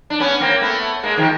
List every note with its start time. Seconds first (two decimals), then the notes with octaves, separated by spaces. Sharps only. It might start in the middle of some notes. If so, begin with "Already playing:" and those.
0.10 D4
0.20 B3 C#4
0.40 A#3 C4
0.61 A3 B3
1.03 G#3 A#3
1.17 D#3 F3